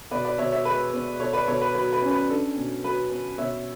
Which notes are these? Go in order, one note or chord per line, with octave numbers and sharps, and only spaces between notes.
B2 B4 D5
B4 D5
B2 C#5 E5
C#5 E5
G#3 B4
B3
B2 A4 C#5
B4 D5
B2 A4 C#5
B4
F#3 B4
B4
C#4
B4
D4 A4
B2
F#3 B4
B3
B2 C#5 E5